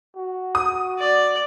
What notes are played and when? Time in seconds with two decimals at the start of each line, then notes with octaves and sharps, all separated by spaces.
0.17 F#4
0.55 D#6
0.99 D5